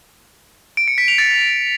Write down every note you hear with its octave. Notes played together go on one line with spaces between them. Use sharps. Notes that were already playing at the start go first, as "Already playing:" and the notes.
D7
C#7
B6
F7
A6